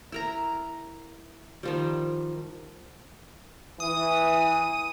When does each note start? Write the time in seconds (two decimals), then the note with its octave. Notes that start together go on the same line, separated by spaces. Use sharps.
0.12 E4 A#4 A#5
1.63 D#3 F3 G3
3.80 E3 D#6